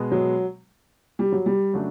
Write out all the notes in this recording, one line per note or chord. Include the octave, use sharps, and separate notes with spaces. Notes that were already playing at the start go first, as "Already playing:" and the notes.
Already playing: B2 G#3 B3
F#3
G3
F#3
G3
C#3 F#3 A3 D4